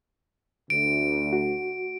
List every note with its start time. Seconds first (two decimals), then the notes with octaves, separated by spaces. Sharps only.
0.70 D2 D7
1.33 F#4